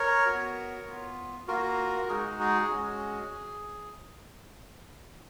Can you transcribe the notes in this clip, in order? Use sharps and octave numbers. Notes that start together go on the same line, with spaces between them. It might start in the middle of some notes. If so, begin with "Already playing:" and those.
Already playing: A#4 C#5
B3 F#4
B3 F4
A#3 F4 F#4 A#4
G#3 D#4 F#4 G#4
G#4
G#3 C#4 F#4